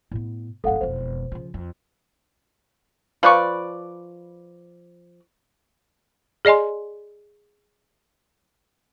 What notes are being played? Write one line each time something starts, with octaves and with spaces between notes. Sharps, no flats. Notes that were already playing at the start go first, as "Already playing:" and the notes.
A2 B3
G#1 F2 A4 F5 F#5
E1 F2 C5
C#3 F3
F2
F3 B4 D5 C#6
G#4 D5 D#5 G#5 C6